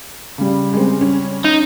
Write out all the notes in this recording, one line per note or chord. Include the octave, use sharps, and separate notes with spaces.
C#3 G3
G#3 C4
C#4
D#4